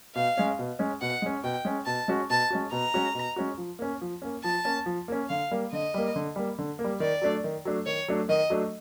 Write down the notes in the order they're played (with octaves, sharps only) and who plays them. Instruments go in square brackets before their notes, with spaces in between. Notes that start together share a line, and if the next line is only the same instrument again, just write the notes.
[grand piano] B2 [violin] F5
[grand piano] G#3 C#4
B2
G#3 C#4
[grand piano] B2 [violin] F#5
[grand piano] G#3 C#4
[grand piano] B2 [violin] G5
[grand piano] G#3 C#4
[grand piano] B2 [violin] A5
[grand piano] G#3 C#4 F#4
[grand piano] B2 [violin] A5
[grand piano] G#3 C#4 F#4
[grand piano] B2 [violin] A#5
[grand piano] G#3 C#4 F#4
B2
G#3 C#4 F#4
F3
A#3 C#4
F3
A#3 C#4
[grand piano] F3 [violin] A5
[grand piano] A#3 C#4
F3
A#3 C#4
[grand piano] D3 [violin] F5
[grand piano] G3 A#3
[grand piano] D3 [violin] D#5
[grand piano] G3 A#3
D3
G3 A#3
D3
A#3
G3
[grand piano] D#3 [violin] D5
[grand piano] F#3 A3 D4
D#3
F#3 A3 D4
[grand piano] D#3 [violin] C#5
[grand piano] F#3 A3 D4
[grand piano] D#3 [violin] D#5
[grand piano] F#3 A3 D4